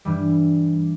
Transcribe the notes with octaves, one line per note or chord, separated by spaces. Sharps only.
G2 E3 G3